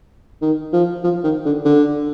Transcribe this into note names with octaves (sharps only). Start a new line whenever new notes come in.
D#3
F3
F3
D#3
D3
D3